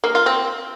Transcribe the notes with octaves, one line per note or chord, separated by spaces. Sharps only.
A#3
F4
C4